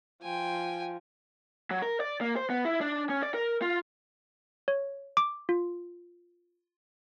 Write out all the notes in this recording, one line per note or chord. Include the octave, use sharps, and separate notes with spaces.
F3 G5 G#5
F#3
A#4
D5
A#3
C5
B3
E4
D4
C#4
D5
A#4
F4
C#5
D6
F4